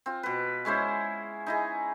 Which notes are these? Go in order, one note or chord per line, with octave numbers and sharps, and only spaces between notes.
C4 F4
B2 B4
G#3 C#4 E4 C5
D#4 E4 G#4